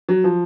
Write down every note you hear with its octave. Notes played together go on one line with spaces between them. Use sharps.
F#3
F3